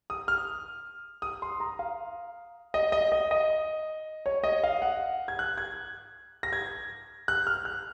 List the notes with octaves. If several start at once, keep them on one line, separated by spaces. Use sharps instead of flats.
D#6
F6
D#6
C6
A#5
F5
D#5
D#5
D#5
D#5
C#5
D#5
F5
F#5
G#6
F#6
G#6
A#6
G#6
F#6
F6
F#6